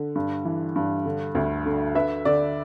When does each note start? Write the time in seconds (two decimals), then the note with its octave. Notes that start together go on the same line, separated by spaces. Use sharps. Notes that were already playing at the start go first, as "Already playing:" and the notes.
Already playing: D3
0.15 G2
0.45 E3
0.76 G2
1.06 D3
1.35 D2
1.66 D3
1.95 D3 B4 E5
2.25 D3 D5